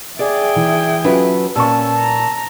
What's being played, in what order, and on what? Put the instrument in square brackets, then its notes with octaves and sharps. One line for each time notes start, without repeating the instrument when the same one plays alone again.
[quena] G#4 [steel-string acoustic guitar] D5 [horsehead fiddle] E5 G5
[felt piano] E3
[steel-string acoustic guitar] F#3 A4 B4 [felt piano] C#4 F4 F#4
[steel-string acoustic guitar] A#2 [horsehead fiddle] C#4 [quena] A5 [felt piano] C#6 E6
[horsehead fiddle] A#5